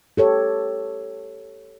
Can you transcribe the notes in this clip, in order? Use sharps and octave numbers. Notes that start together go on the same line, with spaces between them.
G4 A4 C#5